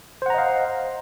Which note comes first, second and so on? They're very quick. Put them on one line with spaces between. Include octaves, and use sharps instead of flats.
C5 F#5 A#5 D#5 F5